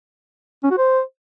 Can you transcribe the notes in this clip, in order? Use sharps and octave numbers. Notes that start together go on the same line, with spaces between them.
C#4
F#4
C5